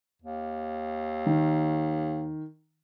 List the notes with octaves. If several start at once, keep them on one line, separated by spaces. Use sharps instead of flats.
D#2
D#3